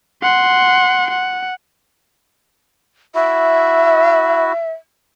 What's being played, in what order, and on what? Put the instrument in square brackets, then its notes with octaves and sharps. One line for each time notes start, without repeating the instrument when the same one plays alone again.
[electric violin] F#5 C6
F#5
[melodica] E4 F#4 [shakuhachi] E5